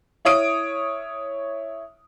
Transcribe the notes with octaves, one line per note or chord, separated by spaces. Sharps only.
E4 C#5 D#6 D7